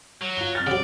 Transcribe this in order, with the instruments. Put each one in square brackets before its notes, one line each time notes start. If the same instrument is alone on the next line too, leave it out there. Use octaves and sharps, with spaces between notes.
[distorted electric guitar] F#3
[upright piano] F4 F7 G7
F2 F6 A6
[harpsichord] C#3 F#3 [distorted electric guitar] D5